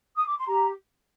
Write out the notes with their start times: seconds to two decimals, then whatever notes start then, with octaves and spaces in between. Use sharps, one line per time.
0.16 D#6
0.27 D6
0.37 C6
0.46 G4 A#5